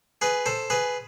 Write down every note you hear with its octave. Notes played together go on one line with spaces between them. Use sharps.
G#4 B4
A4 C5
G#4 B4